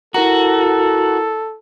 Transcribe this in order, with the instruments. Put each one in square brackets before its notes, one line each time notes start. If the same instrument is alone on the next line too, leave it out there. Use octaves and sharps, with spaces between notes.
[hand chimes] E4 A#4 A#5 [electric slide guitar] F#4 [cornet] A4